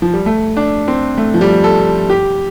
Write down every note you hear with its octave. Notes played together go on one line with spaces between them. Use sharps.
F3
G3
A3
D4
C4
A3
F3
G3
A4
G4